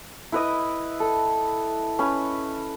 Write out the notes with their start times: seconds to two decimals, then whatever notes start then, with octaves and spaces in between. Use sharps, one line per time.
0.32 E4 B4 D#5
1.00 A4
1.99 C#4 B4